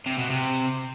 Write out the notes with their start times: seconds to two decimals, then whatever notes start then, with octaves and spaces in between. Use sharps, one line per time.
0.06 C3
0.18 B2
0.30 C3